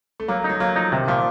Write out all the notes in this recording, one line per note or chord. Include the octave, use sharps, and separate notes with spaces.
A3
F#3 A#3
A3
D#4
F#3
F#3 A#3
F3 D#4
C3 D#3
A#2 F3